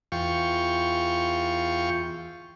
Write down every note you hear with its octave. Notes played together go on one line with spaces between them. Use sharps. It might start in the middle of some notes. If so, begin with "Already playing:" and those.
E2 F4 G5 C#6